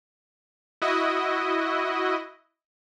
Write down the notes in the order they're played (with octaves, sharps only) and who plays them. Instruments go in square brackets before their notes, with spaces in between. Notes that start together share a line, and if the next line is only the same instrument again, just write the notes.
[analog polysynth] E4 F#4 D#5